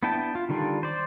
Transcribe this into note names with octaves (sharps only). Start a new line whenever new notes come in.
B3 D4 E4 G5 A5
F4
D3 D#3 G3 D4 F4
C5 D5